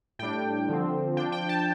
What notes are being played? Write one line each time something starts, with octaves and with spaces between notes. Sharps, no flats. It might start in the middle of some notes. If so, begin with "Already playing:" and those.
A2 G3 D4 G5
D3 F3 C4
F3 D4 G5
G5
A5